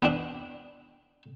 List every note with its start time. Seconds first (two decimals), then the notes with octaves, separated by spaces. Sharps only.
0.02 B3 C4 D4